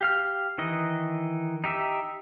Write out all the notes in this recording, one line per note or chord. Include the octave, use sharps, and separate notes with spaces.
G4 F5 F6
D#3 E3 D#5
D#4 G4 E5